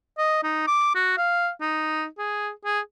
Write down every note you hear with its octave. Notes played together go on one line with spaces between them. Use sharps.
D#5
D#4
D6
F#4
F5
D#4
G#4
G#4